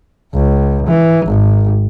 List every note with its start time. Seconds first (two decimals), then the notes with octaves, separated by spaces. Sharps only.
0.34 C#2
0.87 E3
1.26 G#1